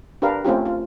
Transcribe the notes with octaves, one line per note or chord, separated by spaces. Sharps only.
D4 G4 A#4 B4 F5
A3 C4 C#4 F4 G4
F4